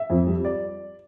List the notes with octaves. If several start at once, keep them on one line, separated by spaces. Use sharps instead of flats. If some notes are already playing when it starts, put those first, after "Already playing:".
Already playing: E5
F2
G3
D5